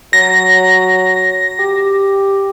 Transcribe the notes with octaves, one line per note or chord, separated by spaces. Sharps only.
F#3 A#6
G4